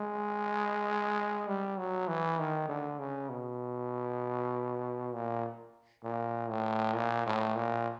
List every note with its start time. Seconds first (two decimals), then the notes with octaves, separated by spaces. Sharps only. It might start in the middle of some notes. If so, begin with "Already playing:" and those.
Already playing: G#3
1.47 G3
1.78 F#3
2.08 E3
2.39 D#3
2.69 D3
2.99 C#3
3.30 B2
5.13 A#2
6.04 A#2
6.49 A2
6.95 A#2
7.26 A2
7.56 A#2